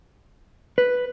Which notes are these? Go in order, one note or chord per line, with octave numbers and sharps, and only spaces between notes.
B4